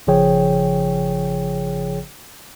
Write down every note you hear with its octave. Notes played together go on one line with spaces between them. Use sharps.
G#1 C#3 F3 G#4 C#5 G5